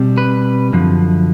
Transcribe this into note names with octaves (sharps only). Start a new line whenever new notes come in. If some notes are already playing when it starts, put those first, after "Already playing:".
Already playing: B2 G3 C4
B4
F#2 D3 F3